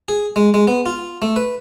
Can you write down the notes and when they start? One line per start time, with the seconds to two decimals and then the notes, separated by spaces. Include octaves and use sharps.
0.08 G#4
0.36 G#3
0.54 G#3
0.67 B3
0.86 F4
1.22 A3
1.36 B4